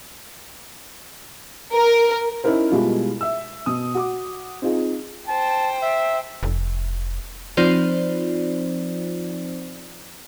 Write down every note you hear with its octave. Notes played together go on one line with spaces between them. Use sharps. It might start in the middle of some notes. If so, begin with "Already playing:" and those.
A#4
C#4 D#4 E4 A#4 C5
B2 G3 G#3 E4 F4
E5 E6
B2 D#6
F#4 D6
C4 D#4 F4 G#4
C5 G5 A5
E5
F1
F3 C4 D#4 F4 C5 D5